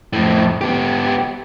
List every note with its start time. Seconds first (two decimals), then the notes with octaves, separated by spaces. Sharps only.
0.13 F2 A2
0.61 B3 G4